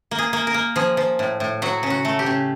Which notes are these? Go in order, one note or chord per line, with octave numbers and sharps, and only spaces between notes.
A#3
G#4
A#3
A#4
A#3
F3 G#4
F3
A2
A2
F#3 F#4
C#3
F#4
A3
G4
C#3